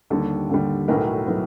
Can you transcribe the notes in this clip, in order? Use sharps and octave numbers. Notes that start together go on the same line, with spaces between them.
D#2 D3 G3 A4
D#2 D3 G3
B1 A2 F#3 B3 A#4
A2 F#3 B3